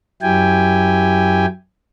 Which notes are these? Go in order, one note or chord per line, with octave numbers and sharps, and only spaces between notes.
F#2 F#3 E4 G4 G5 G#5